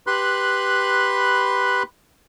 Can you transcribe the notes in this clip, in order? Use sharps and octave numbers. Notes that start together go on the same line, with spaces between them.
G4 B4 B5 C6 F#6